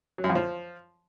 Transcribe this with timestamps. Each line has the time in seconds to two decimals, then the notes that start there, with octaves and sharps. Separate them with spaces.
0.18 F#3
0.24 F#2
0.30 F2
0.35 F3